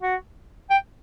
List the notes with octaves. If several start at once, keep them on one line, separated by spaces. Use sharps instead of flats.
F#4
G5